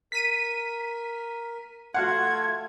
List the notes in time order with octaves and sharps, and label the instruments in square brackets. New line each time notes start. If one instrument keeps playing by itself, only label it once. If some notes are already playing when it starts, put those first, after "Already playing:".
[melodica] A#4 [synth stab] B6 D#7
[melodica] A3 F4 A4 [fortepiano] F#4 F5 F#5 [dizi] G#6